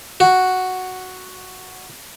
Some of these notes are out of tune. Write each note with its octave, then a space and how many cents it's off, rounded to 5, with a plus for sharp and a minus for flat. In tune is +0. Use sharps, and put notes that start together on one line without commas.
F#4 +0